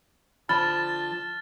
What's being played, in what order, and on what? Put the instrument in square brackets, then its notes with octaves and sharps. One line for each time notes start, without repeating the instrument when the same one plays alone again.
[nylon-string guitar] D3 F3 [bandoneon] A5 [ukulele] B5 [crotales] F6 A6 G7